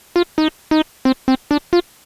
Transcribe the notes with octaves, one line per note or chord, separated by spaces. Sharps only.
F4
D#4
D#4
C4
C4
D4
F4